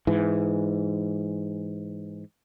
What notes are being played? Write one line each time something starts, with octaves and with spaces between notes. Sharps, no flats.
G#2 E3